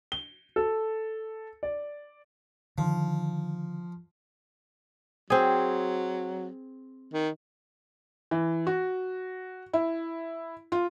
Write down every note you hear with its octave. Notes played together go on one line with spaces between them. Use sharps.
G7
A4
D5
D3 D#3 F3
F#3 C4 G#4
D#3
E3
F#4
E4
F4